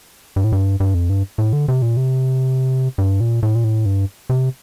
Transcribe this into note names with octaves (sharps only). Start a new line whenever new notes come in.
G2
A2
G2
G2
F2
G2
A2
D3
C3
A#2
C3
G2
A#2
A2
A#2
A2
G2
C3